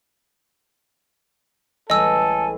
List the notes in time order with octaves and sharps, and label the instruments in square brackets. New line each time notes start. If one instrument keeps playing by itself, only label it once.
[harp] A1 G3 G#3 [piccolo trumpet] A4 [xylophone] D#5 E6 [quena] G#5